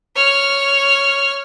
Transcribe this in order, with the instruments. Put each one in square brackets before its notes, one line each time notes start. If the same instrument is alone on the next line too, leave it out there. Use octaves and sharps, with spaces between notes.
[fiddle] C#5 F6